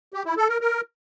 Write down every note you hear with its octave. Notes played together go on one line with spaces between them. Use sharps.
G4
E4
A4
A#4
A#4